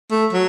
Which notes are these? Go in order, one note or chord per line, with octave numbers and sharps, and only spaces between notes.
A3
F#3